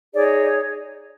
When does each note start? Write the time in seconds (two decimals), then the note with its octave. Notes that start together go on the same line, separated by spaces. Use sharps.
0.14 D#4 G#4 C#5 D5
0.43 D5